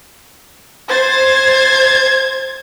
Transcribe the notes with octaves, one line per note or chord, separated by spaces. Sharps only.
C5 G#6 A6